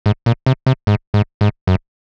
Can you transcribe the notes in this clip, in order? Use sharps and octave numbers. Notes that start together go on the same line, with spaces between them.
G#2
A#2
C3
C3
G#2
G#2
G#2
F#2